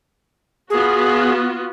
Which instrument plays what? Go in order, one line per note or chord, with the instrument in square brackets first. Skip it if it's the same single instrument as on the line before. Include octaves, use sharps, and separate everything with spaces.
[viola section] B3 F4 F#4 [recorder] G#4